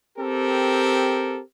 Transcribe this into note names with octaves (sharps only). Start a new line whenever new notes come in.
C4 G4 A4 A#4